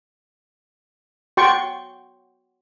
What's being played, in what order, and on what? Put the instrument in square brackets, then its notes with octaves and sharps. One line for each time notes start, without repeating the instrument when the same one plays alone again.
[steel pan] F#4 G5 C6 C#6